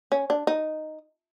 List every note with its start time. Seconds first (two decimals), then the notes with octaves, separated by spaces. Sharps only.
0.12 C#4
0.30 D4
0.47 D#4